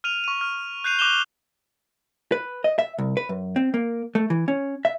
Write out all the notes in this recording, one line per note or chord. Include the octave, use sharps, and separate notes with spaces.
F6 D#7 F7
C#6 D#7
F6
F#6 G6 C7 D#7 F7
D6 F#6 E7 F7 G7
B4
D#5
E5
C2
B4
F#2
C4
A#3
A3
E3
C#4
E5